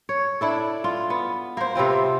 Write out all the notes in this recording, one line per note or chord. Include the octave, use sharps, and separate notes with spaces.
C#5
D4 E4 A4
F4
B3
A#3 C5
C3 B3 C4 F4